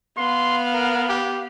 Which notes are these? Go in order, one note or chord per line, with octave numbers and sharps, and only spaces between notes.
B3 F5 C6
A#4
G4